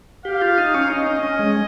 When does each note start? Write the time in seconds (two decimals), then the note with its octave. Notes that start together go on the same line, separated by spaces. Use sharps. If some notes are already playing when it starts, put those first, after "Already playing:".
0.25 G4 F5
0.41 F4
0.58 D#4
0.74 C#4
0.90 D#4 D#5
1.07 C#4
1.23 C#4
1.39 G#3